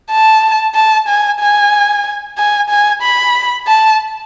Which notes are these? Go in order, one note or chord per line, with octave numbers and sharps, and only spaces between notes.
A5
A5
G#5
G#5
G#5
G#5
B5
A5